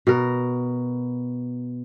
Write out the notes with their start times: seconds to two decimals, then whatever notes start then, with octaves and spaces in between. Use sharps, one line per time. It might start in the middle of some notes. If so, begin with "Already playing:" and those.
0.07 B2 A#4